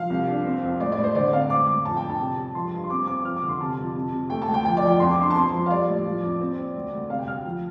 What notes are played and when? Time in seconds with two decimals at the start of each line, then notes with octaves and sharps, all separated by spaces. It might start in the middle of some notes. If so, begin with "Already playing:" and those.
Already playing: F3 F5
0.10 C2
0.27 D4
0.45 C4
0.63 F2
0.80 A2 D5
0.92 D5
0.98 A2
1.04 C5
1.15 D3 D5
1.32 C4 F5
1.49 A2 D6
1.67 A2 D6
1.85 F2 A5
1.97 G5
2.03 D4
2.10 A5
2.20 C3
2.37 G3
2.55 F3 C6
2.72 G2
2.84 C6
2.89 C4 D6
3.07 C4 D6
3.25 F2 F6
3.36 D6
3.43 D3
3.49 C6
3.60 C3 A5
3.78 F2
3.95 C3
4.12 C3
4.30 A3 G5
4.42 A5
4.48 D2
4.54 G5
4.65 F3 G5
4.77 D5
4.83 F3
4.88 G5
5.00 F2 C6
5.11 D6
5.18 D4
5.23 C6
5.30 A5
5.35 C4 C6
5.52 F3
5.66 F5
5.70 G3 D5
5.88 A2
6.05 F3
6.23 F2
6.40 C4
6.58 C4
6.75 D2
6.93 D2
7.10 C3 F5
7.19 G5
7.27 D2 F6
7.45 F3